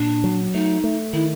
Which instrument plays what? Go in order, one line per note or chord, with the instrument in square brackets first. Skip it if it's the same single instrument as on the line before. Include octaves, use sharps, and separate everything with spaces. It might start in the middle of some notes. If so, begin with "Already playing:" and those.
Already playing: [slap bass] A#2 [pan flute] D4
[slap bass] F#3
[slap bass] A3 [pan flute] D#4
[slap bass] A3
[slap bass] D#3 [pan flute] E4